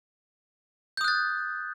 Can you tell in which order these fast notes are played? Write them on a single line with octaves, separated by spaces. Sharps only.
G6 D#6 F#6 A6